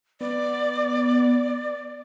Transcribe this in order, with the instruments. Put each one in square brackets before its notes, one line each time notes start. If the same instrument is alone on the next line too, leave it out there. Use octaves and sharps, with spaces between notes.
[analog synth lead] B3 [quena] D5